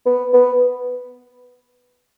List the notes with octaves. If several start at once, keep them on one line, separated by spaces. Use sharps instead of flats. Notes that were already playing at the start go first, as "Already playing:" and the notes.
B3
B3